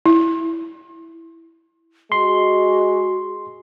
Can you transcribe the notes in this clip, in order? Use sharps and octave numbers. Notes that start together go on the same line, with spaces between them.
E4
G#3 F#4 C6